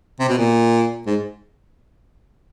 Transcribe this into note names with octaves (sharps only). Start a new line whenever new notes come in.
C3
B2
A#2
G#2